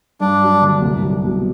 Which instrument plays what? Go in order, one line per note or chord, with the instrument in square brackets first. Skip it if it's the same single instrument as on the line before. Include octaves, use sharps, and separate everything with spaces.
[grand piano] G2 [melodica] D4
[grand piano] F#3
D3
C2
F#3
B2